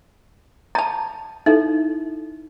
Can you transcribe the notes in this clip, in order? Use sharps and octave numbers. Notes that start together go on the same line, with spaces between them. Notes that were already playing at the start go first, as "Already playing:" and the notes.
A5 A#5
D#4 E4 A4 E5